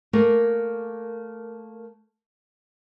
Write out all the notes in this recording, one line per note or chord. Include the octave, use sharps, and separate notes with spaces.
A3 A#3 G#4 A#4